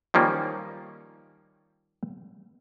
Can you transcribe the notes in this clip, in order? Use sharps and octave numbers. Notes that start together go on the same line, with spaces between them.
D#3 F3 G3 A#3 C#4